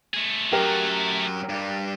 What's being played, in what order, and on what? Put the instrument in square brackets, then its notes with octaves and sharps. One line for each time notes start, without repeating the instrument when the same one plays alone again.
[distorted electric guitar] A3 G#4
[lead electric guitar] F#2 F#3 [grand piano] G4 A#4
[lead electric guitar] G2 G3